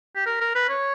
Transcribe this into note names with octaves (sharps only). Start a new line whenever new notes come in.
G4
A#4
A#4
B4
C#5